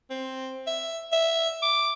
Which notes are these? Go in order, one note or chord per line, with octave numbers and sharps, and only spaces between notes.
C4
E5
E5
D6